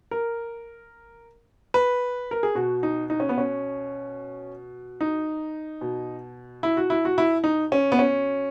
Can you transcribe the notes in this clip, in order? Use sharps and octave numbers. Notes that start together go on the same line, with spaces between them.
A#4
B4
A#4
G#4
B2 F#4
D#4
D#4
C#4
B3
C#4
D#4
B2
E4
F#4
E4
F#4
E4
D#4
C#4
B3
C#4